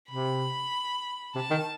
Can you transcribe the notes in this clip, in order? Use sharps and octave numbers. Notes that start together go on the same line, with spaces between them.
C3 B5
C3 A5
D#3